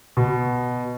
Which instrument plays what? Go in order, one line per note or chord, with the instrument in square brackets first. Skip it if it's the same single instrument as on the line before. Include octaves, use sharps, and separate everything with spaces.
[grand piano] B2